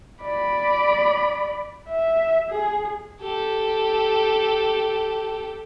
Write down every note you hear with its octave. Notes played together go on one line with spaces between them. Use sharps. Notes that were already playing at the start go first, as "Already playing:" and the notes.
D5 B5
E5
G#4
G4 A4